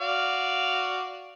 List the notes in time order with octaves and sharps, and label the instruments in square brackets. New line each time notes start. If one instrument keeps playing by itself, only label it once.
[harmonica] F#4 D5 F5